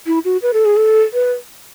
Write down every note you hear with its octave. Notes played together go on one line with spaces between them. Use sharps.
E4
F#4
B4
A4
G#4
A4
B4